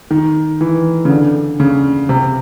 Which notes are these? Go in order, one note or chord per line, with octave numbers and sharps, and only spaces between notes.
D#3
E3
C#3
D3
C#3
C3